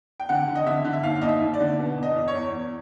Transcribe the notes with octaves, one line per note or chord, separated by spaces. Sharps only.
G5
D3 F#5
D3
D#5
D3 E5
D3
E5
D#2 F5
D#2 D#5
E5
D#2
D5
D3
B2
E2
D#5
E2
C#5
E2
E2